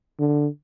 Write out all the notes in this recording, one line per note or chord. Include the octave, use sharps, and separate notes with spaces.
D3